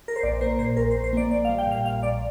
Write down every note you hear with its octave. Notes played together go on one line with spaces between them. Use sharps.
A#4
C5
A#1 D5
A#3 C5
A#2 C5
A#1 A#4
C5
A#1
C5
A#3 D5
A#1 D5
F5
G3
G5
A#2 F5
A#1 F5
A#1 D5